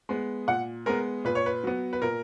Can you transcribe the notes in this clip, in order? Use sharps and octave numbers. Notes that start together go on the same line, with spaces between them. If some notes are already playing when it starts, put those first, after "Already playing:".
G#3 B3
A#2 F#5
G#3 B3 A#4
A#2 B4
C#5
B4
F#3 B3
B4
A#2 A#4